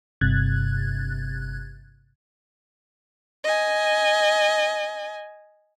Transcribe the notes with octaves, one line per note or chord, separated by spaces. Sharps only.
G1 G2 C3 F#6 G#6 A6
D#5 G#5